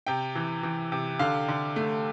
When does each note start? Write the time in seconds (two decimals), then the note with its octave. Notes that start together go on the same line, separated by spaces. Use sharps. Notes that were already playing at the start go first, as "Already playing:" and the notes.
0.07 C3 G5
0.35 E3
0.63 E3
0.92 C3
1.19 D3 F5
1.48 D3
1.76 A3